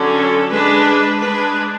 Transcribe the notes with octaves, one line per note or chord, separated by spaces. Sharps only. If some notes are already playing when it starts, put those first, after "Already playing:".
Already playing: D3 F#3 C#4
A4
G#3 D4 B4
G#3 D4 B4